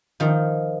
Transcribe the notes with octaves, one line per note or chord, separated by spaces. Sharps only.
D#3 F3